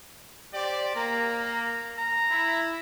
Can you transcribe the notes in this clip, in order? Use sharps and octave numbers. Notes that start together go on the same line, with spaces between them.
G4 C5 D5
A#3 A#5
A#5
A#5
E4